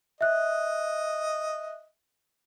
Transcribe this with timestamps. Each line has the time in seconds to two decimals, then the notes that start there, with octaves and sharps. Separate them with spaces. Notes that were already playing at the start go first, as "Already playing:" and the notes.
0.21 D#5 E5 F#6